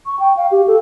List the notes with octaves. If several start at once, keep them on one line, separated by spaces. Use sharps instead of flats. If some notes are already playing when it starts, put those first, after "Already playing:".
C#6
G5
F5
G4
A4